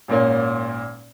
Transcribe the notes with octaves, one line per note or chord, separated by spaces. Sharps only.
G#1 A#2 A#3 C#4